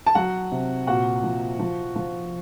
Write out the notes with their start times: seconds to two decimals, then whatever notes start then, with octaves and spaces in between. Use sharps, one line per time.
0.07 A5
0.15 F#3 F#4 F#5
0.52 C3
0.87 A#2 F#4 F#5
1.23 F3
1.59 F3
1.95 F3